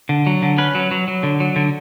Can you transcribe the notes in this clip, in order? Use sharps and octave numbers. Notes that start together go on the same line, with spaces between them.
D3
F#3
D3
C#4 B4
F#3
F#3
F#3
D3
F#3
D3